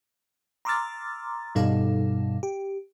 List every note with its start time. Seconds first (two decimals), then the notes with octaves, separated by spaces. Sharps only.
0.65 A#5 C6 D6 E6 F6 A6
1.55 G2 B2 G3 D#4 A4 F5
2.43 G4